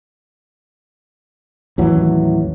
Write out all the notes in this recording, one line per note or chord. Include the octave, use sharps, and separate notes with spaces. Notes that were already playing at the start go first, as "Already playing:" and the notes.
A1 D#2 E3 F#3